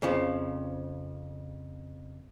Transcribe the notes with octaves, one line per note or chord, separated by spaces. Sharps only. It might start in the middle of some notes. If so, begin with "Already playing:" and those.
F2 C#3 F3